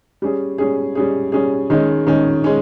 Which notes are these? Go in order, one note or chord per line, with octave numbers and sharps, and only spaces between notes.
G3 C#4 G#4
G3 C#4 G#4
G3 C#4 G#4
G3 C#4 G#4
D#3 G#3 C#4
D#3 G#3 C#4
G#3 C#4